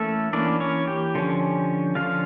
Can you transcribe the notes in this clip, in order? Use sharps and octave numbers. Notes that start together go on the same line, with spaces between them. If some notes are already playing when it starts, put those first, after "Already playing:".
Already playing: E3 A3 A#3 C#4 A4
E3 A#3 C#4 D4 D5
C#4 C#5
G4
D3 F3 C#4
D3 F3 C#4 F4 F5